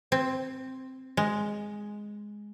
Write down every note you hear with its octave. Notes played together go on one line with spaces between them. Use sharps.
C4
G#3